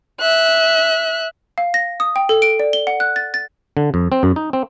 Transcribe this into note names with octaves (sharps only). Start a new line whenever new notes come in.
E5 F#6
F5
A#6
D#6
G5
A4
D7
D5
G7
F#5
F#6
A6
A6
D3
F2
C4
F#2
D#4
C4